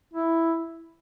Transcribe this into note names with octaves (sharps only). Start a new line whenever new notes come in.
E4